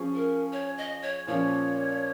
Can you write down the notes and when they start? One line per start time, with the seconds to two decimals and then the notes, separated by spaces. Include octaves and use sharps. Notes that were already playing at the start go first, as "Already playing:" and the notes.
Already playing: F3 C#4 G#4
0.15 A#4
0.53 C#5
0.78 D#5
1.02 C#5
1.27 A#2 F3 C#4 C#5